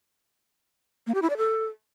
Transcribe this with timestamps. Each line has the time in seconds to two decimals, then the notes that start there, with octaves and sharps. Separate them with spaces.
1.07 A#3
1.14 G4
1.22 E4
1.30 D5
1.37 A4